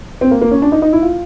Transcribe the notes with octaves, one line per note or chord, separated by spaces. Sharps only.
C4
A#3
A#3
C#4
D4
D#4
D#4
E4
F4